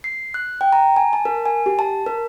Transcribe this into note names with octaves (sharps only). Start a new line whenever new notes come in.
C7
F#6
G5
A#5
G#5
A5
A#4
G#5
G4
A5
A#4